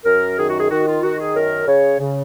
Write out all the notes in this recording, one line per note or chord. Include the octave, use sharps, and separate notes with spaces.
F#2 A#4
D#3 G#4
F#4
G#4
D#3 F#4
F4
D#3 F#4
G#4
F#2 A#4
C#3 C#5
C#3